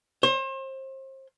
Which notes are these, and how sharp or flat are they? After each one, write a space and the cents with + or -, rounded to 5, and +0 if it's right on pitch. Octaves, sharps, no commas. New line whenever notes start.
C5 +35